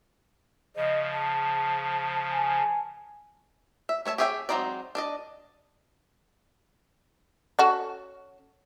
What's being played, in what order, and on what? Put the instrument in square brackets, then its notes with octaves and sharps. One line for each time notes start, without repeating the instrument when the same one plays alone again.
[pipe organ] C#3 F3 [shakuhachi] D#5
[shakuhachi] A5
[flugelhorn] G#5
[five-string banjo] E5
A3 C#5 E5 A5
G4 G#4 C#5 E5 G5
F#3 G#3 C4 D#4 D5
D4 D5 D#5
[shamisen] C#4 F#4 A4